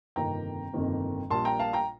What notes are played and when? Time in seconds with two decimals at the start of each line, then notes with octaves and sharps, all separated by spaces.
0.16 G1 F2 C3 D#3 A#3 G5 A#5
0.73 G1 F2 C3 D#3 A#3
1.30 A#1 A#2 G3 A5 C6
1.45 G5 A#5
1.59 F5 A5
1.73 G5 A#5